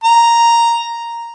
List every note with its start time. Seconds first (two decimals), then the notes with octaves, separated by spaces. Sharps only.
0.04 A#5